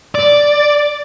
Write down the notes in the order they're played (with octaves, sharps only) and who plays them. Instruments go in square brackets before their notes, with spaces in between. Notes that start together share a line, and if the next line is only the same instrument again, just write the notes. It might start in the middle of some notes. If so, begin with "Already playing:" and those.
[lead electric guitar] D5